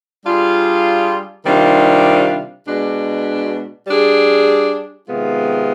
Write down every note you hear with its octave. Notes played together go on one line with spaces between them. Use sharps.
G3 D4 F4 G#4
C3 D#3 G3 D4 F4
B2 G#3 D4
G3 D4 G#4
C3 D#3 G#3 B3 F4